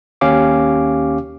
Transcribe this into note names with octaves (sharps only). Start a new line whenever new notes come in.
D#2 C#4 G4 F5 D6